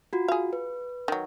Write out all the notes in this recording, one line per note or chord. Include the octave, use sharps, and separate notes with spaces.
F4 F#4
G#4 F5
B4
D#3 F#3